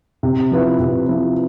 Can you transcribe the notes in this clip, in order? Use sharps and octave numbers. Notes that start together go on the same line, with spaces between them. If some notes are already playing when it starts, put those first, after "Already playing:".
C3
F3 B3 E4 B4
C3
F3 B3 E4 B4